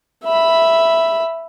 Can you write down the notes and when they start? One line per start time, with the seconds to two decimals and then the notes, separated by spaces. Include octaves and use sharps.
0.25 E5 B5